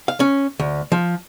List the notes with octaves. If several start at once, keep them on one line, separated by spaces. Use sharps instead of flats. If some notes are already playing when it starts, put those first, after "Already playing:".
F5
C#4
D2
F3